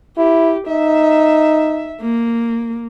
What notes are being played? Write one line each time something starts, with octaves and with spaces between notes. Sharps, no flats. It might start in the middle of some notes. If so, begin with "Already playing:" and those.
E4 G4
D#4 E5
A#3